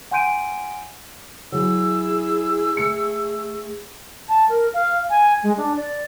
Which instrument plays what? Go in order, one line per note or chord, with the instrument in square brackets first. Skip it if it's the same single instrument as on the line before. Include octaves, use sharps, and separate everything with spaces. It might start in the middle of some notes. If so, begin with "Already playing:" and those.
[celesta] F#5 G#5 C6 G6 D7 D#7
[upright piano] F#3 [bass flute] E4 [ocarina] G#4 [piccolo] E6
[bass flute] A3 [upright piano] C#7
[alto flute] A5
A#4
F5
G#5
G#3
D4
D5